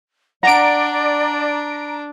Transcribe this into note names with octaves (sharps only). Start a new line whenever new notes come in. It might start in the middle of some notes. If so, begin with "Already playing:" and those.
D4 D5 F#5 A#5 D7